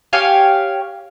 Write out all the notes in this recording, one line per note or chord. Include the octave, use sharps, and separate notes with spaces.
G4 C#5 F5 G#5